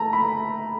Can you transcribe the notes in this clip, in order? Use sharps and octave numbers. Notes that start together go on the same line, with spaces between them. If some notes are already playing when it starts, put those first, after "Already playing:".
Already playing: A3 A5 A#5
B5